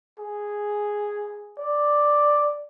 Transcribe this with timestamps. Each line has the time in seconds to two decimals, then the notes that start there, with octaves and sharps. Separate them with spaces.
0.19 G#4
1.59 D5